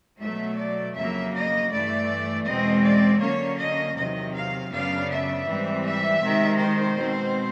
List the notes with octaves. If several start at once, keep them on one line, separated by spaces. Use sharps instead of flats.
B2 F#3 A3 E5
D5
F2 C#3 F#3 A#3 E5
D#5
G2 E3 A3 D5
E2 B2 G#3 C4 D#5
D5
D3 F#3 A#3 C#4 C#5
D#5
E2 C3 D#3 F#3 D#5
F5
F#2 C#3 F#3 B3 D4 F5
E5
G#2 E3 G3 C4
E5
C3 D#3 G#3
C5
B2 G#3 C4